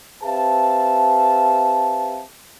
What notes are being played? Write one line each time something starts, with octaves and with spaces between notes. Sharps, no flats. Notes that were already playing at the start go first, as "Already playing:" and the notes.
C4 G4 B4 E5 F5 A5